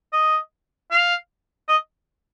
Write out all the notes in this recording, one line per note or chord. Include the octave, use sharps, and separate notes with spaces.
D#5
F5
D#5